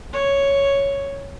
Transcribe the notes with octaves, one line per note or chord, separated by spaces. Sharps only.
C#5